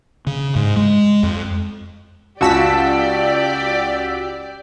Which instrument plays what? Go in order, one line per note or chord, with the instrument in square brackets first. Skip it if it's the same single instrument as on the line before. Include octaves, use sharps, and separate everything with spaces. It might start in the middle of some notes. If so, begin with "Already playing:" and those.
[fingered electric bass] C#3
G#2
G#3
F2
[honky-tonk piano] C#2 A5 [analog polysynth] F#4 E6 B6 [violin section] G4 D5